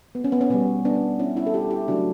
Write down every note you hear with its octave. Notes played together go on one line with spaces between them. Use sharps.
B3
C#4
B3
C#4
B2 G3 B3
B3 D4
C#4 E4
C#4 E4
A4
E4 G4
E4 G4
C#3 F#3 A3 D4 F#4